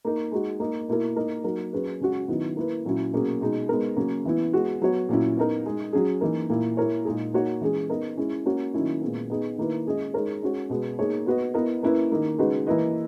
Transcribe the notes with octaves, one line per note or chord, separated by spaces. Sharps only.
A#3 D#4 A#4
G#3 D#4 F#4
A#3 D#4 A#4 D#5
B2 A#3 E4 A#4
A#3 D#4 A#4 D#5
F#3 A#3 D#4 A#4
F#3 C#4 G#4 B4
C#3 G#3 C#4 F#4
D#3 F#3 B3 E4
A#3 E4 B4
A#2 F#3 C#4 E4
B2 F#3 A#3 C#4 G#4
B2 G#3 D#4
G#3 B3 D#4 A#4
C#3 F#3 A#3 C#4
E3 B3 E4
G#3 B3 F#4
F#3 B3 F#4 C#5
A#2 F#3 C#4 E4
B3 D#4 A#4
G#3 D#4 G#4
F#3 C#4 G#4
E3 A#3 D#4 A#4
A#2 A#3 E4
A#3 E4 A#4 C#5
A#2 G#3 D#4 G#4
A#3 D#4 F#4 C#5
E3 G#3 C#4 G#4
B3 D#4 A#4 D#5
G#3 C#4 E4
A#3 C#4 F#4 C#5
D#3 F#3 A#3 C#4 E4
A#2 G#3 B3
B3 D#4 G#4 D#5
D#3 A#3 E4 B4
G#3 C#4 G#4 D#5
G#3 D#4 A#4 C#5
G#3 C#4 F#4 C#5
B2 G#3 B3
A#3 D#4 G#4 C#5
B3 F#4 B4 D#5
B3 E4 A#4 D#5
A#3 C#4 E4 B4
D#3 A#3 D#4
C#3 G#3 D#4 F#4 B4
E3 A#3 E4 B4 D#5